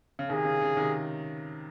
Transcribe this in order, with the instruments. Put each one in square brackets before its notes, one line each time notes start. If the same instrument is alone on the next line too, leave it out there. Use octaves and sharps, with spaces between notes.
[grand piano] C#3
[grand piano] C3 D#3 [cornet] G#4
[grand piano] C#3
C#3
C3 D#3